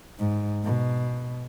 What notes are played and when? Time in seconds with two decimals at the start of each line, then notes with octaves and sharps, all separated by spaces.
0.19 G#2
0.64 B2